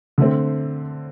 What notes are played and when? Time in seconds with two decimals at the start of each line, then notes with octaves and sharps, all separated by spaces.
0.18 D3 A3 C4